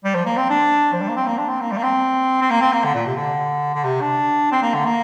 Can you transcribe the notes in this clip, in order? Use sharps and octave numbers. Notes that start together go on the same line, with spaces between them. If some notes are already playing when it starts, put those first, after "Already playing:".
G3
F3
A#3
C4
D4
F3
G3
A#3
C4
A#3
D4
C4
A#3
G3
A#3
C4
C4
A#3
C4
A#3
D3
A#2
C3
D3
D3
C3
D4
C4
A#3
D3
A#3